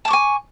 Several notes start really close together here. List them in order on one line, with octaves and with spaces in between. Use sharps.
A5 D6 C#6 G#5